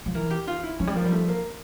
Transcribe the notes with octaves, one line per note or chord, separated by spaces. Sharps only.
F3
E3 A#4
G4
F4
E4
F3 C#4
G3
F3 A#3
G3
A3
A#3